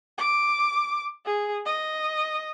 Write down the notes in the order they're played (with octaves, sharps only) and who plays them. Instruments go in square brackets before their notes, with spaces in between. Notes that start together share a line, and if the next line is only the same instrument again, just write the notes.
[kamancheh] D6
G#4
D#5